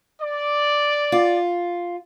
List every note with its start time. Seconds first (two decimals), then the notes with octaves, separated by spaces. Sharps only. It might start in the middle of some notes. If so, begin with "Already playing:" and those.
0.21 D5
1.12 F4